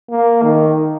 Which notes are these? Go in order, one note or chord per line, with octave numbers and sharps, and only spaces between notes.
A#3
D#3